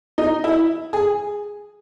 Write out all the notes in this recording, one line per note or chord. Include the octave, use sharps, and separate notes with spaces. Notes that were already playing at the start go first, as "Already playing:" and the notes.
D#4
E4
G#4